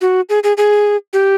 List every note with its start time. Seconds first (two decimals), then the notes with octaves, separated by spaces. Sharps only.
0.01 F#4
0.29 G#4
0.44 G#4
0.57 G#4
1.13 G4